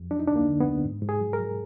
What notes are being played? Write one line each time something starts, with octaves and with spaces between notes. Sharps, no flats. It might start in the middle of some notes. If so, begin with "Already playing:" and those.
Already playing: F2
F#3 D4
D#4
D2 D4
A#3
D3
B3
D2
G#2
G#2
G#4
F#3
A#4
F#3